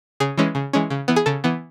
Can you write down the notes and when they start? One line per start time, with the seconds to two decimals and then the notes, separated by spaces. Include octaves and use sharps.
0.20 C#3 G#4
0.38 E3 G#3 C#4
0.55 C#3
0.73 E3 G#3 C#4
0.90 C#3
1.08 E3 B3
1.16 G#4
1.26 C#3 A4
1.44 E3 B3